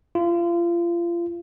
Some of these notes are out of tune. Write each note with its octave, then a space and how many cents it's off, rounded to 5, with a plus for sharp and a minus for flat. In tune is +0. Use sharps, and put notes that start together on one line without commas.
F4 -30